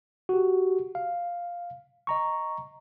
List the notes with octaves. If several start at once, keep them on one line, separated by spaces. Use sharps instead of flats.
F#4 G4
F5
D#5 A#5 C#6